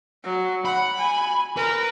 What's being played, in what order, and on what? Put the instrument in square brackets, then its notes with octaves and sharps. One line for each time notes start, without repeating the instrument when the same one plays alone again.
[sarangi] F#3
[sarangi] F#5 [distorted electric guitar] B5
[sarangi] G#5
[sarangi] A#4 [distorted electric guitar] B4